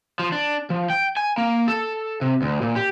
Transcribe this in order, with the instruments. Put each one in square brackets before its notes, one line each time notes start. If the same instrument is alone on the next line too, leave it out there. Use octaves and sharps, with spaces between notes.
[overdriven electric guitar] F3
D4
F3
G5
G#5
A#3
A4
C3
D2
A#2
G4